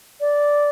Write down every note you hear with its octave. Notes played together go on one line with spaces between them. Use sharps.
D5